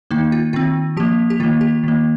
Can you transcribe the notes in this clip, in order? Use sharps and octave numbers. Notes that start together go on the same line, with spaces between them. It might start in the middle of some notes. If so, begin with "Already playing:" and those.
D#3 A#3 D#4
F4
D#3 C4 F4
F3 A#3 G4
G4
D#3 A#3 F4
G4
D#3 A#3